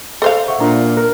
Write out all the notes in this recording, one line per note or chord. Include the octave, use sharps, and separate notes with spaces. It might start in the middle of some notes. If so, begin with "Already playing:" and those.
A4 C5 F5 C6
E5 F#5 C#6
A#2 D4 A#5
A#4